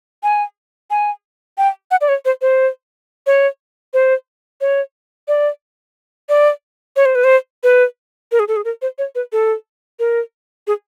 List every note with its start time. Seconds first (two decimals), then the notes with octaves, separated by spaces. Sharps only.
0.23 G#5
0.91 G#5
1.58 G5
1.91 F#5
2.01 D5
2.09 C#5
2.25 C5
2.42 C5
3.27 C#5
3.94 C5
4.61 C#5
5.28 D5
6.29 D5
6.96 C#5
7.05 C5
7.15 B4
7.24 C5
7.63 B4
8.32 A#4
8.40 G#4
8.48 A4
8.56 G#4
8.65 A#4
8.82 C5
8.98 C#5
9.15 B4
9.32 A4
9.99 A#4
10.67 G#4